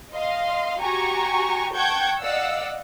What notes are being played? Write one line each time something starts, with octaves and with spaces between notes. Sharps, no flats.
D#5 F5 C6
F#4 G4 G#5 A#5 C#6
F#5 G5 A5 C#6 G6 G#6
D5 D#5 F5 F#5 E6